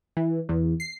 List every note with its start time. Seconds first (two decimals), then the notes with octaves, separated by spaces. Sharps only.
0.17 E3
0.49 E2
0.80 C7